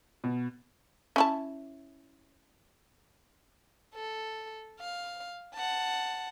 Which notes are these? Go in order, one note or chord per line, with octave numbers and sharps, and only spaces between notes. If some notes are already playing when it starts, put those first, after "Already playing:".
B2
C#4 E4 A5
A4
F5
F#5 A5